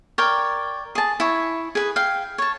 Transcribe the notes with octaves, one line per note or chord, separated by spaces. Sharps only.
A#4 C#5 D5 G5
G#4 A5
E4 C#5
G#4 B4
F5 G5
C#5 A5